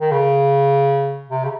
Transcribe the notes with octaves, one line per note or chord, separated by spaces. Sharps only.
D#3
C#3
C3
C#3